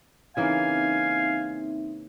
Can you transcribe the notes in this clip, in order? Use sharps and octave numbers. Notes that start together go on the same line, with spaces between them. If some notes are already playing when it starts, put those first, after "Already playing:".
C#3 E3 A#3 C4 D#4 E5 F5 G#5